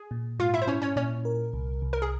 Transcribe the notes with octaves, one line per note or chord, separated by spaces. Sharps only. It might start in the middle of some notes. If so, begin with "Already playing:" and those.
Already playing: G#4 G#5
A#2
G#2 F4 F5
E4 E5
C5
C#4 E4 C#5
C#4 C#5
A#2 C#4 C#5
A#4
C2
C2
A#4
G#4